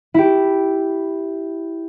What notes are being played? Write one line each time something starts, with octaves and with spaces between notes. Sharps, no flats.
E4 G4